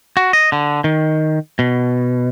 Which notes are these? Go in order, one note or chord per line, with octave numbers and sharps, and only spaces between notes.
F#4
D#5
D3
D#3
B2